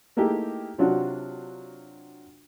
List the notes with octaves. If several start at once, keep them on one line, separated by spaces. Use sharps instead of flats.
A3 A#3 D#4 E4 G4 G#4
C3 F#3 D4 F4 F#4